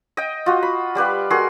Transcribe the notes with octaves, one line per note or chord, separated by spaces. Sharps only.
D#5 G5
F4 F#4
B5
G3 G4 B4 F5
F#4 G#4 A#4 C6